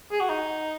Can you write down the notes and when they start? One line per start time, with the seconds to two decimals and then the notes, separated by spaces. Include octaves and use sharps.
0.12 G#4
0.20 F#4
0.29 D#4